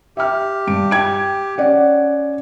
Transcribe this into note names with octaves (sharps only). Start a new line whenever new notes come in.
G4 E5 F6
G2 D7
G5 G#6 D7
C#4 D5 F#5